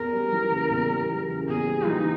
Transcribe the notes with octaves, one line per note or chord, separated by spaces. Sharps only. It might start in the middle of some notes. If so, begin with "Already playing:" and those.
Already playing: E2 A#4
G3
E3
C#3
E2
G3
E3
C#3
E2 G#4
G3
E3 D#4